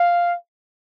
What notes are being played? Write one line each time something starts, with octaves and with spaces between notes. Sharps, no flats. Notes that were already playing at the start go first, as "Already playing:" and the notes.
Already playing: F5